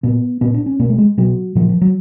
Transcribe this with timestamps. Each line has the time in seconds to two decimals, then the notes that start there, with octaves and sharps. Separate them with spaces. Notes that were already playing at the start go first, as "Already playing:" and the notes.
0.03 A#2 B3
0.41 A#2 B3
0.54 D4
0.66 C#4
0.80 B2 A#3
0.90 A3
0.98 G#3
1.18 B2 F#3
1.55 A#2 F3
1.69 F3
1.82 F#3